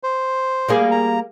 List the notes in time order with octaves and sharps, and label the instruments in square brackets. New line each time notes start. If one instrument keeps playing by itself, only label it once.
[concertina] C5
[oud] G3 A#3 G#4
[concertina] A#5